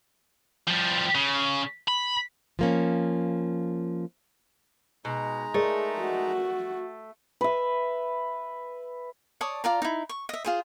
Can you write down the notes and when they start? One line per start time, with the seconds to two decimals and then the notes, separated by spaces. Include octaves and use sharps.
0.68 F3 G3
1.15 C#3
1.88 B5
2.59 F3 A#3 C#4
5.05 B2 G#3 D#4 A#5
5.54 A3 G#4 A#4 D5
6.00 F#4
7.41 B4 E5
9.41 C#5 D5 A5 D#6
9.64 F4 D5 A#5
9.82 D#4 E4
10.09 C#6
10.29 D#5 E5
10.44 F4 G#4 C5